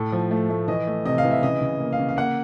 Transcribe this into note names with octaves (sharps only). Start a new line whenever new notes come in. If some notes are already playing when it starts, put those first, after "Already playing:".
Already playing: A2 A4
F3
A3
A3
E3 D#5
A3
C3 D#5
F5
E3
E5
C#3 D#5
C#3
A#3
F5
C#3
F5
A#3 F#5